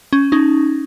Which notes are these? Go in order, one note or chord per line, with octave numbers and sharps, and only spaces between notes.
C#4
C#4 D#4